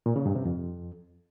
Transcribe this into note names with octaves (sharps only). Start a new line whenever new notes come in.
A#2
C#3
G2
C3
F2